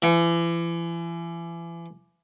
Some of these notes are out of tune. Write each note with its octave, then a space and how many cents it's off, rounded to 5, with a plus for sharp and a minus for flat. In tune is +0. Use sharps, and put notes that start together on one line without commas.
E3 +35